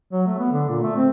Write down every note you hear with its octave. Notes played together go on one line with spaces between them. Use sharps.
F#3
A3
B3
D3
A#2
A3
C4